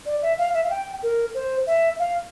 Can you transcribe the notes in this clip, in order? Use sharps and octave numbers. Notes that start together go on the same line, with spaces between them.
D5
E5
F5
E5
F5
G5
A#4
C5
E5
F5